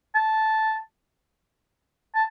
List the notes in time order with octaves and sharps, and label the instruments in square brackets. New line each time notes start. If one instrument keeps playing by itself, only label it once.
[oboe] A5
A5